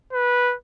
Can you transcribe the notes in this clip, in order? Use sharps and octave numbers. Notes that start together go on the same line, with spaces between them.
B4